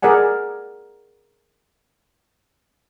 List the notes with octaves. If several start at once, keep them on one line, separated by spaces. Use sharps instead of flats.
G#4 A#4 D5 F#5 G#5